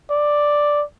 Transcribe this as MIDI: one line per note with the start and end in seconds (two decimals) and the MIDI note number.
0.11 0.83 74